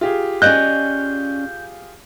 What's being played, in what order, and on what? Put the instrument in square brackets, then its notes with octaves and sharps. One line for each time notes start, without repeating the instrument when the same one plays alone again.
[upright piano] F4 G4 G#4
[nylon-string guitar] C#4 D5 D#5 [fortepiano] F#6 [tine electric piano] G6